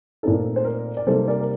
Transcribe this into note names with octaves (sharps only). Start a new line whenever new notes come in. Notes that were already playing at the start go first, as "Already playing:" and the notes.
A#2 A3 C4 D#4 A4
C5
A#4
D5
C3 G3 A#3 D#4 A4 C5
A#4 D5
A#4